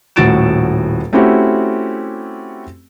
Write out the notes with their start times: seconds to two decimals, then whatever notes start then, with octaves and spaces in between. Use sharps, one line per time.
0.16 D#1 A2 F#4 A6 D7 E7
1.13 A3 C4 C#4 E4 F#4 G4